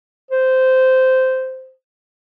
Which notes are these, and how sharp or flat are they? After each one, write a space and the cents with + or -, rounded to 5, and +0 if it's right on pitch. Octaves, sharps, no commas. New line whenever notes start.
C5 -10